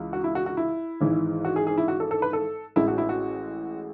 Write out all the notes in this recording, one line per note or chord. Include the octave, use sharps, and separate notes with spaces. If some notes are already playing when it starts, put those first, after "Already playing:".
Already playing: C#2 E3
F#4
E4
F#4
F#4
E4
G#1 G#2 E3
F#4
G#4
G#4
E4
F#4
A4
A4
B4
A4
A1 A2 G#3 E4
F#4
E4
F#4